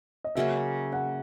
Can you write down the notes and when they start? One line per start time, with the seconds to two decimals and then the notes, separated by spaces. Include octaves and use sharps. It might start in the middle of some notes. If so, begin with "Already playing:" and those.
0.24 D#5
0.36 C#3 F#3 A#3 C#4 E5
0.93 F#5